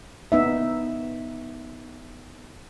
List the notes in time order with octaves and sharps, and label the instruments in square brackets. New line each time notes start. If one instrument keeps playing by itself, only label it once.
[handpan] B3 D#4 E5